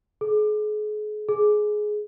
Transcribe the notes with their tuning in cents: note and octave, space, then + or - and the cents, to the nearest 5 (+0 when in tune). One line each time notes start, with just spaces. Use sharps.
G#4 +35
G#4 +15